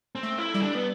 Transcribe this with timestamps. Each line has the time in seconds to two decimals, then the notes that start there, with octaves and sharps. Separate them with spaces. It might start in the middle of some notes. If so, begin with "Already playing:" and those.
0.15 C4
0.23 A3
0.38 E4
0.54 G3
0.62 D4
0.75 B3